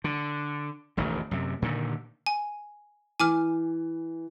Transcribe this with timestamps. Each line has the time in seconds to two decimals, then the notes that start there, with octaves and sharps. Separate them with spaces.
0.04 D3
0.97 E1 A1 D2 D#3
1.31 F#2 C3
1.62 A#2 D3 D#3
2.27 G#5
3.20 E3 G#5 D6 F6